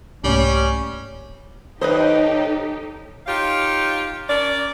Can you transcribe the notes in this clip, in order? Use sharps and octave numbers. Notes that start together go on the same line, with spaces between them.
C2 G#2 G3 A3 A#3 C#4
D#2 A2 D#4 G4 A4 B4 C5 D#5
D#4 F4 G4 C#5 F5
C#4 A#4 D5